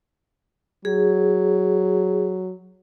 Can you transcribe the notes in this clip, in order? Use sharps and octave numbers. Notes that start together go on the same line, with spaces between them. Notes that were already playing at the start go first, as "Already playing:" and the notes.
F#3 G#4